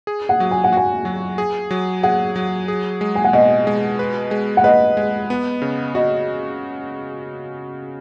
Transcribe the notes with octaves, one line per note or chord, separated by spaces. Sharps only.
G#4
F#5
F#3
G#5
F#5
F#4 G#5
F#3
G#4
F#3
G#4 F#5
F#3
G#4
G#3
G#5
F#5
B2 D#5
G#3
B4
G#3
F#5
B4 D#5
G#3
B3
C#3
F#4 D#5